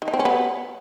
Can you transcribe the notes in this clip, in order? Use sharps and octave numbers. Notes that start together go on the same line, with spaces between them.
D#3
D#4
C4
C#4
B3